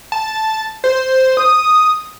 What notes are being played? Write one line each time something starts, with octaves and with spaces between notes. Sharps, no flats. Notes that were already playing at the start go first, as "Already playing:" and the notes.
A5
C5
D#6